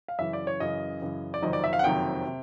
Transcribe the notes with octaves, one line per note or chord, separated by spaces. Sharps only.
F5
F#2 C#3 E3 E5
D5
C#5
F#2 C#3 E3 D#5
F#2 C#3 E3
D5
F#1 F2 C3 D#3 F#3 D#5
D5
E5
F5
F#5
F#1 F2 C3 D#3 F#3 G5
C3